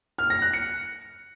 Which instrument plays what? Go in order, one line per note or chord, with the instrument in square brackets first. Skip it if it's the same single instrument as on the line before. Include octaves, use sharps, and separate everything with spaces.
[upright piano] F6
A#6
F#6
C#7